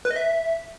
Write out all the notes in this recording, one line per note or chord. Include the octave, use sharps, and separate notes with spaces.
B4
D#5
E5